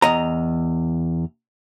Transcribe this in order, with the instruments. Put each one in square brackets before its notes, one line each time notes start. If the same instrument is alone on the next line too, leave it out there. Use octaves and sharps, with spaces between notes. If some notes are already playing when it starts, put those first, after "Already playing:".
[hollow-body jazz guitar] E2 D#5 A#5